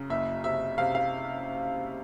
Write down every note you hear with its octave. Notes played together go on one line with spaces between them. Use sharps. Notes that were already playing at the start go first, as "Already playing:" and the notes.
Already playing: F#2 C#3
F#1 E5
C3 E5
C3 F5
F5